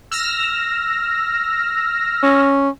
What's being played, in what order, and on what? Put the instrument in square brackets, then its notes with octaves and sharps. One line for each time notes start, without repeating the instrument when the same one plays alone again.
[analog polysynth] E6 F6 A#6
[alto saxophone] C#4